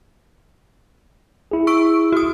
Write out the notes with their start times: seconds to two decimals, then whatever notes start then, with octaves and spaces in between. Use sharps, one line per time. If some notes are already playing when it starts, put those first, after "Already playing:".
1.51 E4 G#4
1.67 C#6 E6 D7
2.12 F#4 D#6